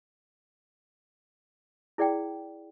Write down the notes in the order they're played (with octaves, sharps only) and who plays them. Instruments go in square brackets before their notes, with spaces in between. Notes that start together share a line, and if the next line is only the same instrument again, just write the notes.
[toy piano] E4 G#4 D5 F#5 G5